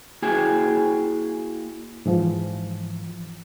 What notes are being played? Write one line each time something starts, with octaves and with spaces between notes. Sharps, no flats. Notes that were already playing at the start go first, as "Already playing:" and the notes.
A#3 E4 F#4 G#4 G5 G#5
G#2 E3 F3